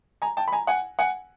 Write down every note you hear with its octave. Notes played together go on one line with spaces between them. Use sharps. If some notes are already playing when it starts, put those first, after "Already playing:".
G#5 A#5
G5 A5
B5
G#5 A#5
F#5 G#5
F#5 G#5